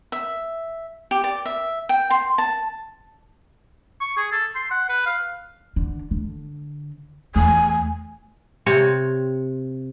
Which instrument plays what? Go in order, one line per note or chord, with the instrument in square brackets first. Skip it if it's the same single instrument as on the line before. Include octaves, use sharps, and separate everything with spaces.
[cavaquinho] E5
G4
D5
E5
G5
C6
A5
[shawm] C#6
G#4
A4
C6
F#5
B4
F5
[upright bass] D3
D3
[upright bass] E2 A3 [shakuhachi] G#5
[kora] C3 C4 C#5